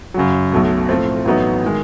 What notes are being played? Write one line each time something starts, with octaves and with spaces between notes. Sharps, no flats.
F#2 C#3 F#3
B1 B2 F#3 A3
A2 F3 A3 C4
A1 A2 F#3 B3 D#4
D#3 G#3